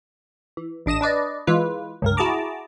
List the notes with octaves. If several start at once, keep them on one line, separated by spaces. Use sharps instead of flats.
E3
A1 D4 D#5 D#6 E7
D4 B4 D5 D#5
E3 G#3 F4 B4
C#2 G2 A#4
E4 F#4 G#4 A5 A#5 D6